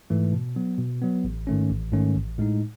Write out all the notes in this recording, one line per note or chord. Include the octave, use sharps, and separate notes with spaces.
G#2 E3 A3
B2
F#3 B3
B2
F#3 B3
A1
G#2 D#3 A3 C#4
A1
G#2 D#3 A3 C#4
A1
A2 G#3 D#4